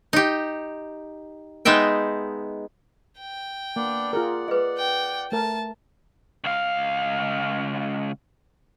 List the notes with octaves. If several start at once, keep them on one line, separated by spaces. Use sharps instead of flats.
D#4 G4
G#3 B3 D#4 E5 G5
G5
A#3 B3 D4 D5
F4 G#4 A#4 D5 F#5
G#4 B4 D#5
G5
A3 A#4 A5
C#2 F5